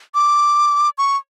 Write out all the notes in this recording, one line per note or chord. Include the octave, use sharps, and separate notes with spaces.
D6
C#6